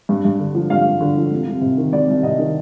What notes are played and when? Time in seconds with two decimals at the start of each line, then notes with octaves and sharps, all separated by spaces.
0.09 G2
0.25 G2
0.39 D3
0.55 F3
0.70 G2 F5
0.86 G2
1.00 D3
1.17 F3
1.31 C2
1.47 C2
1.61 C3
1.77 D#3
1.92 C2 D5
2.08 C2
2.23 C3 D#5
2.39 D#3